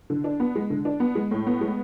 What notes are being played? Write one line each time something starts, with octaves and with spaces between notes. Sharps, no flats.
D3
D4
B3
G#3
D3
D4
B3
G#3
A2
B3
G#3